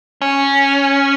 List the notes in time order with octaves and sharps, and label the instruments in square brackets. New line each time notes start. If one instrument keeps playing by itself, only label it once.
[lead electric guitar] C#4